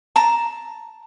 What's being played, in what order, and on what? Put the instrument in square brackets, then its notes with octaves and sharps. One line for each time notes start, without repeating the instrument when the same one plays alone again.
[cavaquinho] A5 A#5